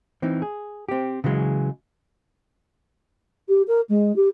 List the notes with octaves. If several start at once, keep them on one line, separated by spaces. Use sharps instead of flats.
E3 C4 D#4
G#4
C4 G4
C#3 E3 F#3 G#3
G4
A#4
G#3
G4